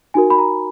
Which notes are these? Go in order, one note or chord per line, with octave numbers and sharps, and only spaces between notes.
D#4 F#4 A#4 G#5
B5
A#5